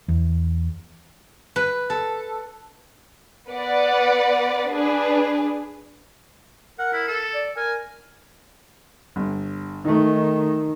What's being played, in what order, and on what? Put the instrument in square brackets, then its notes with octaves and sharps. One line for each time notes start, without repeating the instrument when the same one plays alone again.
[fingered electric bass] E2
[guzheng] B4
A4
[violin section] B3 B4 D5 F#5
D4 G#4 B4
[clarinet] A#4 [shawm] F#5
[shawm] E4
A4
[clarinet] D5
[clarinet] A#4 [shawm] G#5
[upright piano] G1
[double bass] D#3 [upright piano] A3 D#4